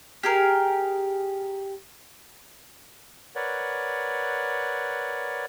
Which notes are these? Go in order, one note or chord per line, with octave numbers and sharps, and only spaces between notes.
G4 G#4 A#4
A#4 B4 C#5 D5 F#5